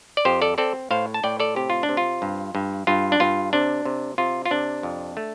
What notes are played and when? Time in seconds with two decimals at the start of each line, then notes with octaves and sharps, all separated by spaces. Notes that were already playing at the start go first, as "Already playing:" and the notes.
0.17 D5
0.25 F2 G4 C5
0.42 A4 D5
0.58 C4 A4 D5
0.91 A2 C5 F5
1.14 A5
1.23 A2 D5 G5
1.40 A4 D5
1.56 C3 G4
1.70 F4
1.83 D4
1.89 C3
1.97 F4
2.22 G2
2.55 G2
2.87 G2 F4
3.12 D4
3.20 G2 F4
3.53 C3 D4
3.85 C3
4.18 C3 F4
4.46 F4
4.51 C3 D4
4.83 F2
5.17 A3